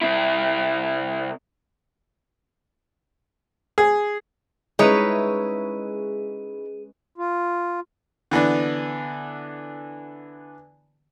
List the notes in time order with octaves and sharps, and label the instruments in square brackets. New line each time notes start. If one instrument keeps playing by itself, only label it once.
[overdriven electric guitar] C3 E4
[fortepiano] G#4
[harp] G#3 C#4 B4 [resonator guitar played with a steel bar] D#4 E4 C#5 [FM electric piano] G#4
[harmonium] F4
[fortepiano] D3 E3 B3 D4